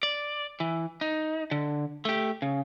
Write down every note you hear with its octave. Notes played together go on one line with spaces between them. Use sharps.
D5
E3
D#4
D3
A3 G4
C#3